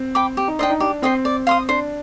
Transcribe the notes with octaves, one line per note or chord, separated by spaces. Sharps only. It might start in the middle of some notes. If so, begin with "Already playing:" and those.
Already playing: C4
G5 B5 D6
G4
D#4
D4 C5 D#5 G5
D#4
D4 G4
C4 C5 D#5 G5
D5
F5 C6 D#6
D4 C5